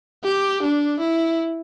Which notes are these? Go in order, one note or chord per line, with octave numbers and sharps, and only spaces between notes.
G4
D4
E4